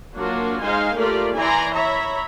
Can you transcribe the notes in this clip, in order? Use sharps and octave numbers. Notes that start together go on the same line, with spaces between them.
F#3 A#3 D4 F4 F#4
G#3 D#4 C5 F5 G#5 C6
A3 A#3 F4 G4 A#4 D5
E3 E4 D5 G#5 A#5 C6
C#5 E5 A#5 B5